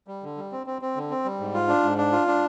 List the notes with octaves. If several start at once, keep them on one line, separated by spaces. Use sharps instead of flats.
G3
D3
G3
C4
C4
C4
D3
C4
G3
G#2
F4
D4
G#2
D4
F4
D4